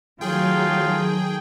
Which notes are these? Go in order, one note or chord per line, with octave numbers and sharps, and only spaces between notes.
D#3 F#3 A3 F4 G#4 G5